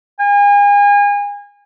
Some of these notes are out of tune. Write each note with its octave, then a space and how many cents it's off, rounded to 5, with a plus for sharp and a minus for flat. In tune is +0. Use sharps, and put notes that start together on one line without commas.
G#5 -35